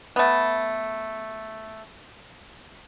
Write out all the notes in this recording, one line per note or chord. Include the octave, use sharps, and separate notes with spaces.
A3 B3